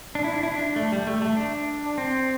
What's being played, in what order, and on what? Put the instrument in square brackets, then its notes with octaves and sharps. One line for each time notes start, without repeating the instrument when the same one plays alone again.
[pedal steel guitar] D4
E4
D4
E4
D4
A3
G3
A3
A3
D4
C4